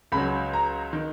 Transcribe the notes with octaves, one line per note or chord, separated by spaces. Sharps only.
C#2 C#3 F#3 B5
A#5
D#3